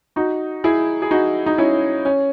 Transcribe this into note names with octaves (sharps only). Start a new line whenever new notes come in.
D#4 F#4
E4 G#4
G#4
D#4 F#4
D#4
C#4 E4
C#4